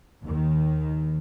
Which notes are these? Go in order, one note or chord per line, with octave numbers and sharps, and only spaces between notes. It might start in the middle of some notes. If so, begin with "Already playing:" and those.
D#2 D#3